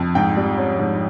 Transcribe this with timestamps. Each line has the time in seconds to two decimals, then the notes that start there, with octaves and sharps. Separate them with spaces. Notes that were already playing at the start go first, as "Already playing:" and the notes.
Already playing: F2
0.15 G#2 G5
0.37 G3
0.58 C#4
0.79 G#2